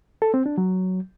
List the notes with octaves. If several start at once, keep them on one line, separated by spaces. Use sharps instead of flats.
A4
C4
D4
F#3